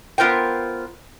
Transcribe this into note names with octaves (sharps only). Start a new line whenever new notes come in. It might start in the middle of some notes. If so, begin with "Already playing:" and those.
B3 F4 A#4 C5 G5